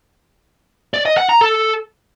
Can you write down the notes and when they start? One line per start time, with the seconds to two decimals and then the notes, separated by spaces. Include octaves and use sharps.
0.94 D5
1.06 D#5
1.17 F#5
1.29 A#5
1.41 A4